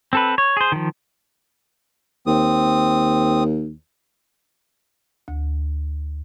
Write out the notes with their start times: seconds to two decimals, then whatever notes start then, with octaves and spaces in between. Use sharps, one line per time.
0.13 C4 A4 B4
0.38 C#5
0.57 G#4 C5
0.72 D#3 F3
2.27 D#2 C4 D#6
5.28 D2